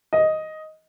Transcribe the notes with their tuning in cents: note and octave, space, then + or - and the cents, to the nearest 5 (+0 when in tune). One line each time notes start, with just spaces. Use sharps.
D#5 +5